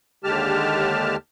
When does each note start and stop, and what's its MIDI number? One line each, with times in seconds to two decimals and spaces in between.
0.24 1.16 39
0.24 1.16 50
0.24 1.16 56
0.24 1.16 67
0.24 1.16 81
0.24 1.16 89